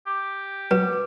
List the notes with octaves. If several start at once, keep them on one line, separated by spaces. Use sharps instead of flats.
G4
F#3 B4